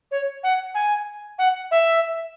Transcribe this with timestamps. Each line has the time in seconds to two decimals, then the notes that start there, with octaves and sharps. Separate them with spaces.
0.11 C#5
0.43 F#5
0.75 G#5
1.39 F#5
1.71 E5